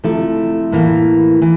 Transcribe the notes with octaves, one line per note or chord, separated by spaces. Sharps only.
C3 F3 A3 E4
A2 E3 A#3
E3